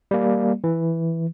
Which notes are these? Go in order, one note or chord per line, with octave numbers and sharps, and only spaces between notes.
G3 A#3
E3